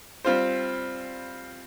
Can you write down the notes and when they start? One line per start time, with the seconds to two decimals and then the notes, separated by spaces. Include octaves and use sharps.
0.25 G3 C4 F4 C5